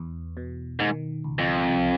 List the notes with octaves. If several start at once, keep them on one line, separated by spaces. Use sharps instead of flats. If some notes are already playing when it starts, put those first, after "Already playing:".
Already playing: E2 E3
B2
G#2 D#3
C#2
F2
C2